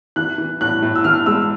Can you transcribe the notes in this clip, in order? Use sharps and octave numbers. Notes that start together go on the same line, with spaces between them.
E3 F#6
E3
A2 F#6
A2
E6
E3 F6
G#3 E6